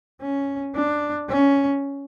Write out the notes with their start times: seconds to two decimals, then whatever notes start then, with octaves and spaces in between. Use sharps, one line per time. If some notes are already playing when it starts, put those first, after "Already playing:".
0.21 C#4
0.74 D4
1.29 C#4